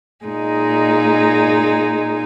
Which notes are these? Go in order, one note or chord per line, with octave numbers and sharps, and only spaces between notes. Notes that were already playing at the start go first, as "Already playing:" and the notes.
A#2 G#3 D#4